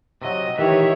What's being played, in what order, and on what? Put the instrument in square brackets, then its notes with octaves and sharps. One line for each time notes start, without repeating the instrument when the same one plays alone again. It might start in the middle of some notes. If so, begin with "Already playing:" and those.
[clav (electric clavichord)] C3 F#3 [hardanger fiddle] D#5
[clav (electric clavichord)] D#3 D#5 F#5 [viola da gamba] E3 C#5 [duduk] G4 [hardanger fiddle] E5